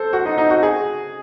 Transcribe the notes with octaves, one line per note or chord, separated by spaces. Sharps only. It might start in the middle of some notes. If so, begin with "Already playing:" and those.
Already playing: A4 C5
F#4
D#4
D#4
F#4
G#4